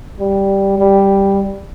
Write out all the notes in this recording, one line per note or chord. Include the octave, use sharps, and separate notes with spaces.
G3
G3